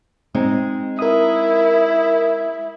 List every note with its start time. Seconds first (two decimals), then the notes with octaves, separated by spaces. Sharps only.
0.34 G#3 C4 D#4
0.99 E4 A#4 D#6